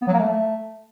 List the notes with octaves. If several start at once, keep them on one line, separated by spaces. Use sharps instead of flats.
B3
F#3
A#3
A3